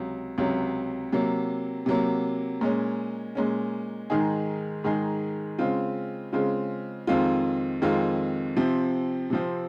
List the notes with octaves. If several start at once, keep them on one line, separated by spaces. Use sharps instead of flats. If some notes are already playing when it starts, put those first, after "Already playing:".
Already playing: C#2 C3 F#3
C#2 C3 F#3
C3 F#3 A#3
C3 F#3 A#3
A#2 G#3 C#4
A#2 G#3 C#4
G#2 D#3 G#3 D#4 G#4
G#2 D#3 G#3 D#4 G#4
C#3 G#3 C4 F4
C#3 G#3 C4 F4
F2 D#3 G#3 C4 F4
F2 D#3 G#3 C4 F4
C3 F3 C4
C3 F3 C4